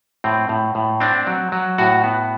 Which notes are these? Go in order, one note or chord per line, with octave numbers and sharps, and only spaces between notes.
A2 C4
A2
A2
C4 D4
F#3
F#3
A2 F#4
B3